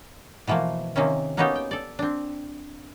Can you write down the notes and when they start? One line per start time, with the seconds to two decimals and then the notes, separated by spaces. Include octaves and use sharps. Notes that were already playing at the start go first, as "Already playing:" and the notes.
0.47 B2 E3 F3 A3 A#3
0.96 C3 D#3 A#3 C4 C#4
1.37 A#3 B3 C#4 D#4 F#4 G4
1.55 G5
1.71 A4 D5
1.99 C4 D4